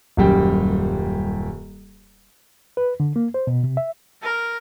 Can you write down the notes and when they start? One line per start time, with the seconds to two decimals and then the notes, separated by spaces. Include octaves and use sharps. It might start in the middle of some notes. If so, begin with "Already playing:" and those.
0.17 D#1 F#2 G3 G5
2.77 B4
3.00 D3
3.16 A#3
3.34 C5
3.47 B2
3.64 C3
3.77 E5
4.23 A#4